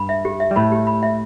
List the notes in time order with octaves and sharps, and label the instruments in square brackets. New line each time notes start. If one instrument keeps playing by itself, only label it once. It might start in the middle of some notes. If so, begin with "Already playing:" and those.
Already playing: [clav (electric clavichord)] G2 [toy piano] B5
[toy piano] E5
G4
E5
[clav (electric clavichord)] G3
[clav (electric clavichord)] A2 A3 [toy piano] B5
[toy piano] G4
B5
E5